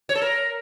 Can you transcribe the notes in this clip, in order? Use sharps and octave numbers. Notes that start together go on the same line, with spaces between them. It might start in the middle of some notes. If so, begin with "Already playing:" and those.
C#5
A4
A#4